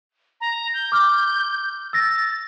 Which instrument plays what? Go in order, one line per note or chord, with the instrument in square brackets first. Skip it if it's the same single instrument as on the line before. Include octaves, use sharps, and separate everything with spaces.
[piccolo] A#5
G6
[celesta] D6 F6
[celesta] E6 A#6 [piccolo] A6